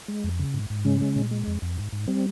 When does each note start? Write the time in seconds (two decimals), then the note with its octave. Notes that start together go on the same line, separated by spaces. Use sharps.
0.08 G#3
0.24 F2
0.40 C#3
0.54 G#2
0.70 G#2
0.85 C#3 G#3 C#4
1.01 G#3
1.16 A#2
1.31 G#3
1.47 F2
1.62 F2
1.78 G#2
1.93 G#2
2.08 G3 C4